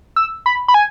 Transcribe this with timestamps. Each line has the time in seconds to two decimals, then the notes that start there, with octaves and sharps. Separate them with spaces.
0.16 E6
0.46 B5
0.68 B5
0.74 G#5